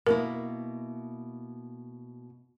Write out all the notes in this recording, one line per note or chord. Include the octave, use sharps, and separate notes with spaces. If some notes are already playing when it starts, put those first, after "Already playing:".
B2 A#3 E4 A#4